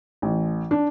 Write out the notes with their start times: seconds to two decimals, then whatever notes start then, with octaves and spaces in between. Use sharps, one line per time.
0.22 A1
0.71 D4